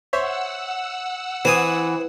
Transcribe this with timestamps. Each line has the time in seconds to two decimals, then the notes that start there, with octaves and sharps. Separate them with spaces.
0.13 C5 C#5 E5 F#5 E6
1.45 E3 C4 G#5 D#6